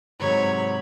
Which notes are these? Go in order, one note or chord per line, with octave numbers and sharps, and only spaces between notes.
G#2 C3 F#3 C#5 B5